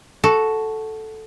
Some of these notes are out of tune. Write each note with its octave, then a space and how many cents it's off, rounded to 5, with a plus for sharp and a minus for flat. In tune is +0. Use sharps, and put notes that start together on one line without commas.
F#4 +0 A4 -5